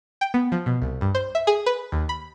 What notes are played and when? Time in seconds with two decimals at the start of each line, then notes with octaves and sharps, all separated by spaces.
0.21 G5
0.34 B3
0.52 F3
0.66 B2
0.82 C2
1.01 G2
1.15 C5
1.35 E5
1.47 G#4
1.66 B4
1.92 D#2
2.09 B5